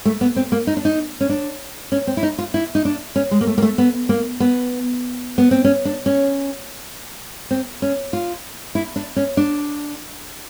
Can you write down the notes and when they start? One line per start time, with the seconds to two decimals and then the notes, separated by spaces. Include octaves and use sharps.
0.05 A3
0.21 B3
0.36 C4
0.52 A#3
0.67 D#4
0.77 D4
0.85 D#4
1.21 C#4
1.30 D4
1.92 C#4
2.07 C4
2.17 E4
2.23 D#4
2.38 F4
2.54 E4
2.75 D#4
2.85 D4
3.16 C#4
3.31 G#3
3.41 A#3
3.47 A3
3.58 A#3
3.62 A3
3.78 B3
4.09 A#3
4.40 B3
5.38 B3
5.51 C4
5.64 C#4
5.85 D4
6.06 C#4
7.51 C4
7.82 C#4
8.13 F4
8.75 E4
8.96 D4
9.16 C#4
9.37 D4